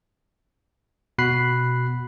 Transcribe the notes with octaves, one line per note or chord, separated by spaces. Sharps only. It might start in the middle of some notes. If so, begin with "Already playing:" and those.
B2 F#4 B5 F#6 C7